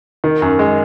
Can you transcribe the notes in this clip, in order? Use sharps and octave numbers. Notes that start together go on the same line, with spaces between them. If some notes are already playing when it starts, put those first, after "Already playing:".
D#3
F#2
G#3